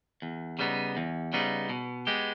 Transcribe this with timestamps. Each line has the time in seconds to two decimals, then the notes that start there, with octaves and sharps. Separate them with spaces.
0.22 E2
0.59 C#3 G3 B3 D#4
0.97 E2
1.33 C#3 G3 B3 D#4
1.69 B2
2.07 G#3 B3 G4